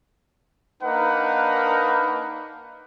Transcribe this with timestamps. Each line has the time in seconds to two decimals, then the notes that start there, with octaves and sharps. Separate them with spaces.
0.83 A#3 D4 D#4 A#4 B4 F#5